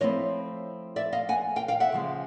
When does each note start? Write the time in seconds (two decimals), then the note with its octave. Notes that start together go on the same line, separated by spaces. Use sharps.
0.01 F3 A3 C4 E4 C#5 D#5
0.96 D5 E5
1.13 D#5 F5
1.29 F#5 G#5
1.56 F5 G5
1.68 F5 G5
1.80 E5 F#5
1.92 C#3 F3 G#3